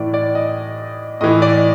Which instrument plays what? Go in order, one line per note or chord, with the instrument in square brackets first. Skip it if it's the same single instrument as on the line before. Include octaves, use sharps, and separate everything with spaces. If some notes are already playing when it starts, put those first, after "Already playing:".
Already playing: [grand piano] A2 E3 D5
D5
D#5
A2 E3 D#5
D5